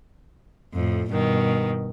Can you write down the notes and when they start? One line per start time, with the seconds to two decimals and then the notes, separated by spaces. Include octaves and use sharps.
0.73 F2 A2
1.09 G2 B2 D#3